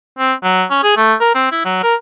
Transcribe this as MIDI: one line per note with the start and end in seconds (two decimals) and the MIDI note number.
0.19 0.33 60
0.43 0.64 54
0.71 0.81 61
0.83 0.92 68
0.97 1.14 57
1.20 1.32 70
1.35 1.49 60
1.51 1.60 64
1.65 1.82 54
1.83 1.95 70